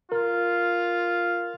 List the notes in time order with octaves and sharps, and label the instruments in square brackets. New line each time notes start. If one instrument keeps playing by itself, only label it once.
[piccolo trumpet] F4 [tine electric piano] A#4